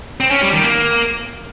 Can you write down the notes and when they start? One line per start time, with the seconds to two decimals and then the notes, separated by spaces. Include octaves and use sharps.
0.20 C4
0.31 C#4
0.42 G3
0.53 D#3
0.63 A#3